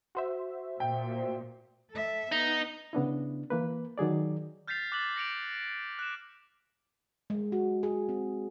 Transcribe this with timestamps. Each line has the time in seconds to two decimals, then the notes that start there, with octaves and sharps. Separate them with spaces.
0.15 F#4 C5 E5
0.80 A#2 G5
1.91 A4 E5
2.32 B3 D#4
2.93 C#3 B3 D4 E4
3.50 E3 A#3 B4
3.98 D#3 F#3 G#4 D5
4.68 F6 G6 A6 B6 C7 F7
4.92 D6 F#6 A6 B6 C7 F#7
5.16 A#6 C#7 D7 F7
5.99 F#6 E7
7.30 G#3
7.52 F#4
7.83 G#4
8.09 C4